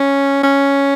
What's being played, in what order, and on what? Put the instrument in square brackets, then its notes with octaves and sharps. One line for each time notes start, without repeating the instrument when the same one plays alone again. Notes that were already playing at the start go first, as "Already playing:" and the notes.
Already playing: [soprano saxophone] C#4
C#4